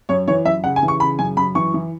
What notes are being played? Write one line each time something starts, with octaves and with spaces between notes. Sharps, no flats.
F#2 C#5
E3 C#5
F#2 E5
C#3 F#5
G#5
E3
C#6
C#3 B5
F#2 G#5
F#2 B5
E3 C#6
E3